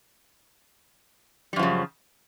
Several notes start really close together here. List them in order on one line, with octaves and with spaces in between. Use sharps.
G3 F#2 F3 C#3